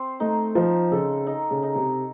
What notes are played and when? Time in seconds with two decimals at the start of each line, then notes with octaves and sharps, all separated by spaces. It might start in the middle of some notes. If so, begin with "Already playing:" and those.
Already playing: C4 C5
0.20 A3 D#4
0.55 F3 D#4
0.91 C#3 A4
1.27 D#4
1.51 C#3
1.63 D#4
1.75 C3